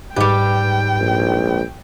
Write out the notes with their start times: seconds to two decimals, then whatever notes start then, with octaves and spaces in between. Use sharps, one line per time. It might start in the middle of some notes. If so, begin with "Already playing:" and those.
0.16 G#2 G3 G4 B4 G5
1.00 A#1